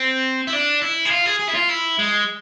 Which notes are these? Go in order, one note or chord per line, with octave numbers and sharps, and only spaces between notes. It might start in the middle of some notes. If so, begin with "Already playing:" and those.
Already playing: C4
E4
D4
E4
G#4
F4
G#4
G#4
E4
F4
E4
G#3